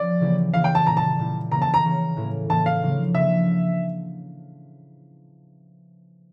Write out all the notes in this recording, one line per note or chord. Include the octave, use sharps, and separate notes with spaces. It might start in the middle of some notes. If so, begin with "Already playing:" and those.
Already playing: F3 C#4 D5
C#3 E3 A#3 E4 G4
C#3 E3 A#3 E4 G4 F5
G5
A5
A#2 G3 A#3 E4 A#5
A5
A#2 G3 A#3 E4
C#3 E3 A#3 C#4 A#5
A5
A#5
C#3 E3 A#3 C#4
A2 E3 A#3 E4
A2 E3 A#3 E4 A5
F5
C#3 F3 A#3 D4
C#3 F3 A#3 D4 E5